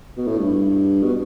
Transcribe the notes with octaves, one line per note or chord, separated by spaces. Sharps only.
B2
A2
G2
B2